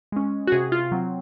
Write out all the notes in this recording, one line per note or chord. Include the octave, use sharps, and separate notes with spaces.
G#3 C#4
F#4
C3 G#4
F4
F#3 C4